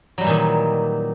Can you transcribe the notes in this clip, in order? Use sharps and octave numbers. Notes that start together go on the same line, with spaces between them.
A#2 D#3 E3 F#3 G3